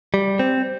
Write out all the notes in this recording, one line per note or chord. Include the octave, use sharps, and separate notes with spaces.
G3
C4